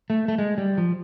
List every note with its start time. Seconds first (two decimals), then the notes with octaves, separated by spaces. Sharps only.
0.10 A3
0.28 A3
0.38 G#3
0.58 G3
0.78 F3